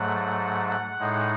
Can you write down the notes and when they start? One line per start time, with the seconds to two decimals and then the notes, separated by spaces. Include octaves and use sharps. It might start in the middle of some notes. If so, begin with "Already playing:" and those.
Already playing: G#2 F#3 A3 F#5
0.99 A2 G#3 D#4